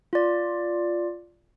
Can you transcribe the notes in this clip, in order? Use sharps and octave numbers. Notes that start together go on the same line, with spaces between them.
F4 D5